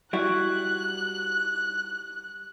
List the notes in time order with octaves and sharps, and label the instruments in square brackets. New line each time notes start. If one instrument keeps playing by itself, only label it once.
[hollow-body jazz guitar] G3 E4 F#4 [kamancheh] F#6